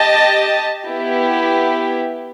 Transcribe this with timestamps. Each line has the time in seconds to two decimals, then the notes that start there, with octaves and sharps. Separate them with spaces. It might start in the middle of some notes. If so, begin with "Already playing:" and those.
Already playing: G4 D#5 A5
0.87 B3 E4 G4